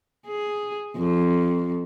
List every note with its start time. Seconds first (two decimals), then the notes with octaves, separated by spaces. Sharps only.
0.27 G#4
0.97 F2